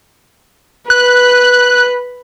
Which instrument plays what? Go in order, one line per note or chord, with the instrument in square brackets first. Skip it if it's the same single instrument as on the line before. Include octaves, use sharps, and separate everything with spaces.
[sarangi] B4 [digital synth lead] F#6